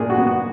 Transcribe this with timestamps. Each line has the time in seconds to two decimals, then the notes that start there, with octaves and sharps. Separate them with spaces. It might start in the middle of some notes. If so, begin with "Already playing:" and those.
Already playing: A#2 D4 G#4 A#4
0.10 F#4
0.18 B3
0.27 F#4